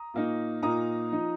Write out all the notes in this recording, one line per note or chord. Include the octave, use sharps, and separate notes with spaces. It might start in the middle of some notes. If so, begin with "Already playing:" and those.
Already playing: A#5 D#6
A#2 A#3 D#4
A#2 A#3 D#4 A#5 D#6
F3 D#4